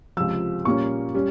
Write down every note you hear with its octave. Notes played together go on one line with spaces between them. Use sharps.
C#2 C3 F3 E6
A#2 G3 A#3 C#4 C#6
G3 C#4